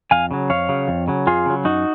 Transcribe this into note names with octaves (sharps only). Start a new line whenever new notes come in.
F2 F5 G#5
C#3 F#3
F2 C#5 F5
C#3 F#3
F2
C#3 F#3
F2 F4 G#4
C#3 F#3
F#2 D#4 F#4